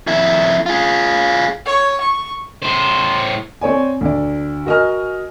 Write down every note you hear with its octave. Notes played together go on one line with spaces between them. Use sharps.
F2 E4
F4 G#4
C#5
C#6
A2 C5
C4 C#5 D5 G#5
D2 D5
F#4 A#4 D#5 G#5 F6